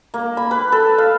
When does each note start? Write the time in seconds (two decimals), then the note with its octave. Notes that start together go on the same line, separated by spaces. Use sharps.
0.14 A#3
0.37 B5
0.51 B4
0.72 A4
0.98 F5